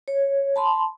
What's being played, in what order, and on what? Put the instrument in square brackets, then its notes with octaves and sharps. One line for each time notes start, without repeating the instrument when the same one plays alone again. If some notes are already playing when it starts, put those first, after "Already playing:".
[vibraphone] C#5
A5 B5 C6